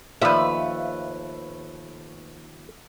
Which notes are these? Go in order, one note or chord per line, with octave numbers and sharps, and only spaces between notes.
D#2 F3 A3 B4 E5